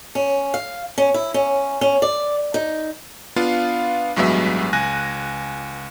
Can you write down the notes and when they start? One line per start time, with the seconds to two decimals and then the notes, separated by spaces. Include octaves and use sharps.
0.15 C#4
0.54 F5
0.98 C#4
1.14 E4
1.34 C#4
1.81 C#4
2.02 D5
2.54 D#4
3.36 B3 D4 F4 F5
4.16 A1 G2 F#3 G#3 B3 E5
4.73 C#2 G#5 F#6 A#6